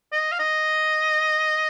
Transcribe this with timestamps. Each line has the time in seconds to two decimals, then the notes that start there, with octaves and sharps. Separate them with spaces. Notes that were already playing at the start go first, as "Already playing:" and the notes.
0.12 D#5
0.32 F5
0.39 D#5